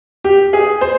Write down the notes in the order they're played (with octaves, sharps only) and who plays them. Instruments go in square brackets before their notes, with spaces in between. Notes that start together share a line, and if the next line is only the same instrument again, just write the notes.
[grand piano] G4
G#4
C5